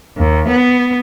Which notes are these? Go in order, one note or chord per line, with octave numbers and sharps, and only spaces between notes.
D#2
B3